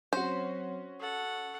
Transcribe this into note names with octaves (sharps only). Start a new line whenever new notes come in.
F#3 C4 C#4 F#4 C5 C#5
A4 F#5 C#6